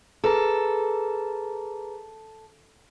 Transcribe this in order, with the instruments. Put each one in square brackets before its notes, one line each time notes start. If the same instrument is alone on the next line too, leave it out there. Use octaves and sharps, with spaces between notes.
[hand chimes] G#4 B4 A#5 [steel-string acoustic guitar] A4